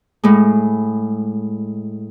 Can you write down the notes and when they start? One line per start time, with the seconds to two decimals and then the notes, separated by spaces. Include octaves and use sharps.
0.24 A2 G#3